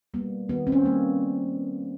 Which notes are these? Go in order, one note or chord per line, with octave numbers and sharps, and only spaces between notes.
G3 A#3 B3
D#3 B3
C4
C#4
G3 A#3